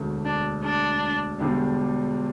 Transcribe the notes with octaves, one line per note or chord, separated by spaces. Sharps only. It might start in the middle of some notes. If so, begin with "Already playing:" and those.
Already playing: E1 D2 D3 A3
D4
D4
E1 E2 D3 G3 D4